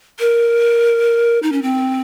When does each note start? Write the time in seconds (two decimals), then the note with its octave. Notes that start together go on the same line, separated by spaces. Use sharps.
0.19 A#4
1.43 D#4
1.52 C#4
1.62 C4